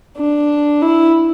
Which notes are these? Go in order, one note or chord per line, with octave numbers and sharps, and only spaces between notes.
D4
E4